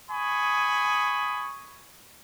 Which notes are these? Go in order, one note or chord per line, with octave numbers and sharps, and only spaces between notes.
G#5 B5 C#6 D#6